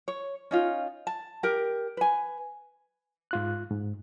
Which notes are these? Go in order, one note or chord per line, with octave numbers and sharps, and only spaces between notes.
C#5
C#4 D#4 F4
A5
G4 A#4
B4 G#5
G#2 F4 F#6
G#2